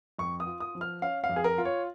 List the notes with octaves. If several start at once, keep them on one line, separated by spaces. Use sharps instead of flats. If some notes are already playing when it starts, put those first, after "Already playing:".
F2 C#6
D#6
F4
D#6
F3
F6
C#4 F5
F5
F2
G#4
A#4
F4
C#5